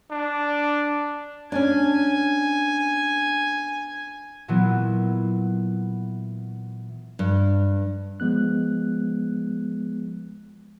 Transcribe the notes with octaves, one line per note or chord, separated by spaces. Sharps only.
D4
C#4 D4 G#5
A#2 E3 F#3 B3
G2
F3 G#3 B3 F#6